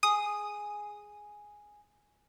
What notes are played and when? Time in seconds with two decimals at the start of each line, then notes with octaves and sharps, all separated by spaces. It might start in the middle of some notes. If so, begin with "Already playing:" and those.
0.03 G#4 D#6